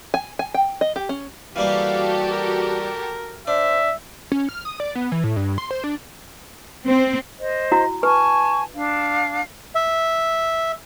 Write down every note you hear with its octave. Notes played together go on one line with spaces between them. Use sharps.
G#5
G#5
G5
D#5
G4
C#4
E3 G3 A#3 F#4 G4 A4 F5
A#4
D4 C5 E5
C#4
F6
D#6
D5
B3
E3
A2
G2
C6
C5
D4
C4
C5 D#5
E4 F#4 A#5
B4 G#5 A5 C#6
D4 F5
E5